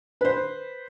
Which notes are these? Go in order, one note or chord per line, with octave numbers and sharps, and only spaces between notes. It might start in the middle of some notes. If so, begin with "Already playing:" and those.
B4 C5